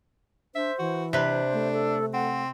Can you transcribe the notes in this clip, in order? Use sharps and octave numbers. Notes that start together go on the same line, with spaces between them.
D4 C5 E5
E3 F#4
C3 D4 B4 C5
A3
A4
C4 F#5